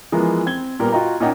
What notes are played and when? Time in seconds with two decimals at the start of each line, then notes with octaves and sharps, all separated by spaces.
0.12 E3 F3 G#3 B3 E4 A#4
0.46 C4 G#6 G7
0.80 A#2 G3 B3 A#4
0.92 F4 F#4 D#5 G5 A#5
1.20 A#2 C#4 D#4 F#5 G5